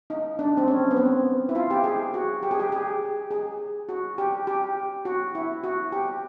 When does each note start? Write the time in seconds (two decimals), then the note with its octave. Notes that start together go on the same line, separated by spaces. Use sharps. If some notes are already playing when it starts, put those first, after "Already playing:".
0.10 D#4
0.39 D4
0.57 C4
0.68 C#4
0.91 B3
0.96 C4
1.49 E4
1.55 F4
1.70 G4
1.84 G#4
2.14 F#4
2.43 G4
2.51 G#4
2.60 G4
2.72 G#4
3.31 G#4
3.89 F#4
4.18 G4
4.47 G4
5.05 F#4
5.35 E4
5.64 F#4
5.92 G4